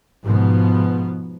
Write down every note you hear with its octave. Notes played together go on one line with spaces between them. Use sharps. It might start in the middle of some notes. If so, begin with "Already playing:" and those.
G#2 B2 F3 B3